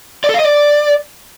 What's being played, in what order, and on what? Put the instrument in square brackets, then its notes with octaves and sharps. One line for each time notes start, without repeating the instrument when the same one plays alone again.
[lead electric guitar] D5
A4
F5
D#5
D5